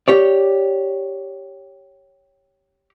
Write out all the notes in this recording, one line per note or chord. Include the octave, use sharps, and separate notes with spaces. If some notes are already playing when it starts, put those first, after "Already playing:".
G4 C#5 D5